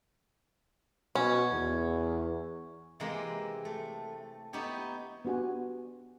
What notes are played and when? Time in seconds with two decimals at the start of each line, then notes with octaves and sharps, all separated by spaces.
1.15 B2 C#4
1.53 E2
3.00 C3 E3 G#3 A#3 C4
3.65 A3
4.53 B3 D#4 E4 G4 C#5
5.25 B3 D4 F#4 G4 G#5